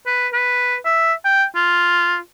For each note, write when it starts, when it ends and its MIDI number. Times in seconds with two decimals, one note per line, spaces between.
0.07 0.28 71
0.33 0.76 71
0.85 1.13 76
1.25 1.44 79
1.56 2.18 65